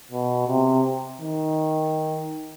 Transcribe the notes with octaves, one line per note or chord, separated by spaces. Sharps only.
B2
C3
D#3